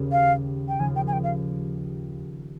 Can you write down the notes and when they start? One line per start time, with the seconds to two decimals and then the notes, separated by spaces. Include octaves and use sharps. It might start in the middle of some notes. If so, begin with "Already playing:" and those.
Already playing: D#2 C#3 G3
0.12 F5
0.69 G5
0.79 D#2 C#3 F3 G#5
0.96 G5
1.08 G#5
1.13 G5
1.24 F5